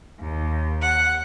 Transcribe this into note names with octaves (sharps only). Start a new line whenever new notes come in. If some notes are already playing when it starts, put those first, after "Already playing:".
D#2
F#5